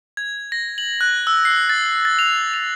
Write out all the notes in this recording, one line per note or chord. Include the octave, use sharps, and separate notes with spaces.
G#6
A#6
F#7
F#6
E6
C7
A6
A6
F7
F7